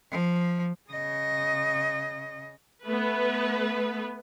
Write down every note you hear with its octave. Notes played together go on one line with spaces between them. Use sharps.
F3
C#3 D#5
A3 B3 B4